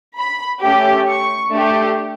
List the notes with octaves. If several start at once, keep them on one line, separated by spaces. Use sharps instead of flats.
B5
A3 C#4 G4
C#6
A3 D4 G4